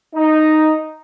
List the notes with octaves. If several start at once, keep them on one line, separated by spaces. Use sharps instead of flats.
D#4